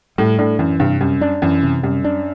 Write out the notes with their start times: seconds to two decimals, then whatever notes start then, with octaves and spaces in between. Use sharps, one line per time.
0.18 A2 G3
0.39 A2 D4
0.59 F#2 E3
0.80 G2 C3
1.01 F#2 G3
1.21 D4
1.42 F#2 E3
1.63 C3
1.83 F#2 G3
2.04 D4